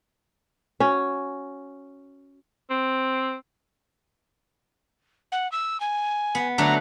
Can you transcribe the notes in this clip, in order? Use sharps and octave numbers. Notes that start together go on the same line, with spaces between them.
C#4 F#4
C4
F#5
E6
G#5
B3
D3 F#3 A3 A#5